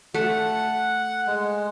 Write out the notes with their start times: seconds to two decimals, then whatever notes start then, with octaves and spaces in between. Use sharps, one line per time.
0.14 A3 F#5
1.27 G#3